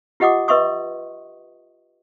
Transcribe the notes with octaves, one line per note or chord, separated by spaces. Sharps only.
F4 G4 D#5 F#5 D6 D#6
B4 D#5 E5 C6 C#6 D#6